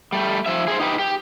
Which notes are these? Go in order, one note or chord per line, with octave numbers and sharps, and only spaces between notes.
G3 A3
F3 E5
G#4 A#4 C5
D#4 G4 B4
G4